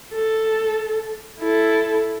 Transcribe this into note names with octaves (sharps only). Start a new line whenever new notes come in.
A4
E4 A4